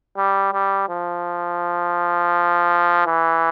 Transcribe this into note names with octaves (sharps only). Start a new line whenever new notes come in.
G3
G3
F3
E3